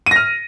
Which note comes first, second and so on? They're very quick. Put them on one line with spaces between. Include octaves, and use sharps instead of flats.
D#7 A#6 F6